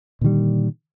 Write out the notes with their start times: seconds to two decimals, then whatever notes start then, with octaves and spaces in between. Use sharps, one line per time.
0.21 A#2 D3 D#3 G3